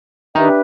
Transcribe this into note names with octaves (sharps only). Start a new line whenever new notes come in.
D#3 D4 D#4 G4 B4 E5